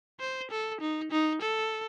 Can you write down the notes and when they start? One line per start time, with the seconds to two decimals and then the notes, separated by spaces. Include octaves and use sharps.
0.20 C5
0.51 A4
0.81 D#4
1.11 D#4
1.42 A4